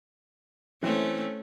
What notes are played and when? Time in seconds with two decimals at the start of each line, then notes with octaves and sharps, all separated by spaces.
0.83 E3 A3 C4 C#4